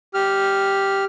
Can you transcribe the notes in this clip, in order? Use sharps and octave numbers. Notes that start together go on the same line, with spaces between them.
G4 F6